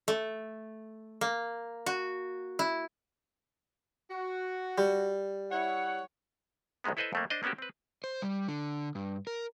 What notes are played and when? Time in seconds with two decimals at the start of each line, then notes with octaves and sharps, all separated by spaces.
0.08 A3
1.21 A#3
1.86 F#4
2.59 E4
4.11 F#4
4.78 G3
5.51 E4 C#5 F#5
6.84 C2 F#2 D#3 G#3 B3
6.97 E4 A4 B4 C5 D#5 E5
7.13 F2 A3 A#3
7.30 D4 C5 D#5
7.43 A#3 B3 C#4 F#4 G4
7.58 C4 B4
8.04 C5
8.22 G3
8.48 D3
8.95 G2
9.27 A#4